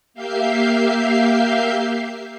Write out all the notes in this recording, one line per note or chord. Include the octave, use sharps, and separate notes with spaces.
A#3 G4 E5 F5 G6 C7